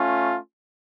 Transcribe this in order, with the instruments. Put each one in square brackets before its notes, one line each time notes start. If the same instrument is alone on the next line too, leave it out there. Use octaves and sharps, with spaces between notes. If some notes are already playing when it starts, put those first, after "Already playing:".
Already playing: [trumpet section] A3 C#4 F4